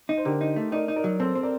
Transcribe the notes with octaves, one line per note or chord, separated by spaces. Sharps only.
D#4
C5
D3 G4 A#4
D#4
A3
D#4 A#4 D5
D#4
A#4 D5
F#3
C4 A4 C5
C4
A#4 D5